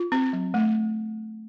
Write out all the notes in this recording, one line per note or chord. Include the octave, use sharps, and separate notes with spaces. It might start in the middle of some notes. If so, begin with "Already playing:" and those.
Already playing: F4
C4
F#3
A3